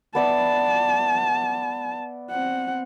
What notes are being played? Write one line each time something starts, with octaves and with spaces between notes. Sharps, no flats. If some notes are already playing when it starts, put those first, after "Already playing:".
B3 D5 E5 A5
C4 F#5